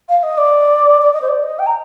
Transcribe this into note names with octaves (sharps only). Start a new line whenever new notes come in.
F5
D#5
D5
D5
D#5
C5
D5
D#5
G5
A#5